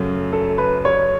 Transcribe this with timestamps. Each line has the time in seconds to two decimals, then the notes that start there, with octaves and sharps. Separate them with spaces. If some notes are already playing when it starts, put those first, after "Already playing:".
Already playing: F#2 C#3 F#3 A3
0.33 A4
0.58 B4
0.85 C#5